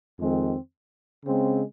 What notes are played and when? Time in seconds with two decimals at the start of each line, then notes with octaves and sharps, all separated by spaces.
0.18 F2 D#3 G#3 C4
1.24 C#3 G#3 C4